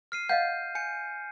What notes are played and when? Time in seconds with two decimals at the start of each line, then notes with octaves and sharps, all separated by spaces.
0.12 F6 C7 D#7
0.29 D#5 F5 F#5 G6
0.75 G#5 G6 C#7